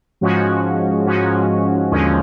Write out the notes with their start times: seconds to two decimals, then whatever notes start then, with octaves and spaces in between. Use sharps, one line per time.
0.21 G#2 F3 G#3 C#4 F#4
1.06 G#2 F3 G#3 C#4 F#4
1.91 D#2 D3 F3 G#3 C#4